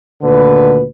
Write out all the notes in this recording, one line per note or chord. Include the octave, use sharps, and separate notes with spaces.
D2 A#2 D3 D#3 B4